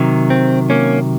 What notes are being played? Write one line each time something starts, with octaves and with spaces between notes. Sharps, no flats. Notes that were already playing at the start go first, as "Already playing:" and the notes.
Already playing: C3 D#3 F#3
C4
A#3 C#4